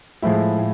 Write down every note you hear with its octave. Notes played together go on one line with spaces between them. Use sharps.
A2 F3 G#3 E4
A2